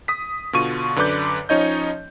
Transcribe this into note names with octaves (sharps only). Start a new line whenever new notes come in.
D#6 B6
B2 D3 F4 C#6 D#7
F#2 D3 B4 D5 D6 G6
F3 C#4 D#4 C#5 D#5 G6